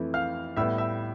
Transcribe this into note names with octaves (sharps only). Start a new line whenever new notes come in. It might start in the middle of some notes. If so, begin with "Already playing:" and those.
Already playing: F2 E3 A3
F5 F6
A2 G3 B3 E5 E6
E5 E6